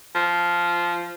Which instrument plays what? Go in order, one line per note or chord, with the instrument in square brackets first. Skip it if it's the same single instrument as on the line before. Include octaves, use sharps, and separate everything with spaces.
[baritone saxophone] F3